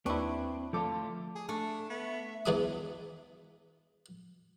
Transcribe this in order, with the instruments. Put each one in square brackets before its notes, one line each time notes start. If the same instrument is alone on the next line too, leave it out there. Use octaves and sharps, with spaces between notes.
[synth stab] D#2 B4 C#6 [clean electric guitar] C4 [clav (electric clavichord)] D4 E4
[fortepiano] D3 A4 D6 [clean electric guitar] F3 A3 F4
[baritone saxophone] G#4
[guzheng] A3 [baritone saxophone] D4
[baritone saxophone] B3 [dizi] E5
[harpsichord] E2 E3 G#4 D6 D#6